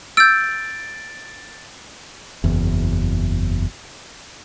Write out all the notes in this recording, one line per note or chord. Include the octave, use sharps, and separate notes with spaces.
E6 G6 A6 D7
F#1 E2